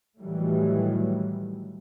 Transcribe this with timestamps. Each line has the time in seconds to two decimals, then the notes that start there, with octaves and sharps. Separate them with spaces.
0.18 A2 D#3 E3 F#3 G3 A3